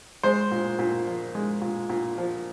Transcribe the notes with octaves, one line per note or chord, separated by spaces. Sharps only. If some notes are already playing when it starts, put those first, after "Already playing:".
G#3 C5
A#2
A#2
F3
G#3
A#2
A#2
F3